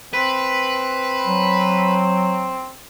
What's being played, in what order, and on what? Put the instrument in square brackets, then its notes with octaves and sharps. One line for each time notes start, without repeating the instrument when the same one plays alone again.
[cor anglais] C4 [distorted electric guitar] B4
[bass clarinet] F#3